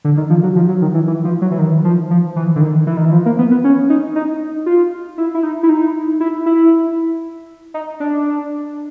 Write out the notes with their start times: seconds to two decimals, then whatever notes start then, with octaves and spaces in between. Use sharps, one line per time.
0.05 D3
0.17 D#3
0.30 F3
0.43 F#3
0.56 F3
0.69 F#3
0.82 D#3
0.94 E3
1.07 E3
1.24 F3
1.41 F#3
1.51 E3
1.59 D#3
1.85 F3
2.11 F3
2.36 E3
2.56 D3
2.61 D#3
2.87 E3
2.97 D#3
3.05 E3
3.12 F3
3.26 A#3
3.39 B3
3.51 B3
3.64 C#4
3.90 D#4
4.16 D#4
4.66 F4
5.18 E4
5.34 E4
5.43 D#4
5.63 E4
5.69 D#4
6.20 E4
6.46 E4
7.74 D#4
8.00 D4